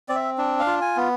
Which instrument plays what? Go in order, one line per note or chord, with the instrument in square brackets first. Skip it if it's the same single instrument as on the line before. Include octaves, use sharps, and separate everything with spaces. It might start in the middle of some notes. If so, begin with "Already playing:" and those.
[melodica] C4 D5
E5
D4
F5
F4
G#5
B3